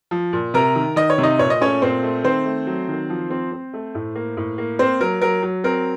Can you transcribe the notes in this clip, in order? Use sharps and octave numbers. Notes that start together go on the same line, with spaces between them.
F3
A#2
C3 A#4 A#5
D#3
D#3 D#5
C#5
C3
D#4 D#5
A#2 C#5
D#5
A3 C#4 C#5
A#2 C4 C5
A3
D#3 C4 C5
A3
F#3
D#3
F3
C4
C4
A3
A2
A#3
A2
A#3
A#3 C4 C5
F#3 A#4
F#3 A#4
F#3
C4 A#4